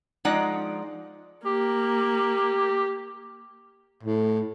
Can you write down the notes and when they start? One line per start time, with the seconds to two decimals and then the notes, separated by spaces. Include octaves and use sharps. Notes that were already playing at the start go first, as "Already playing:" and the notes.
0.25 F3 G#3 D#4 D5 F#5
1.46 A#3 G4
4.03 A2